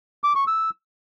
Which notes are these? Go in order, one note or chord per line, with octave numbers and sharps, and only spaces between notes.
D6
C#6
E6